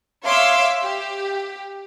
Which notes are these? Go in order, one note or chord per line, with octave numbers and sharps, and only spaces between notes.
C#5 E5 F5 C6 D6 E6
G4